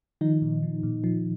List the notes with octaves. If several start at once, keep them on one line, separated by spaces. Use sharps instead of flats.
D#3 F3 D#4
A#2
F3
A#2
F3